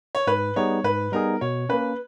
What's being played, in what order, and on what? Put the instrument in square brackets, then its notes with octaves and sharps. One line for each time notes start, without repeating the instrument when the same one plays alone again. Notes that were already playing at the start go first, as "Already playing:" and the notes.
[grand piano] C#5
[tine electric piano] G#2 [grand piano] B4
[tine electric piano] G3 B3 D#4 G#4 [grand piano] C#5
[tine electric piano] G#2 [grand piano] B4
[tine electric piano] G3 B3 D#4 G#4 [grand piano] A#4
[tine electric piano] B2 [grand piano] C#5
[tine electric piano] A#3 C#4 [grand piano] B4